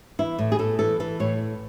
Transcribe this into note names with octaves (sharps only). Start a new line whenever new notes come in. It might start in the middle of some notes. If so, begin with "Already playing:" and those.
E3 E4
A2
G#4
A2 A4
E3 A4
E3 A4
A2 C#5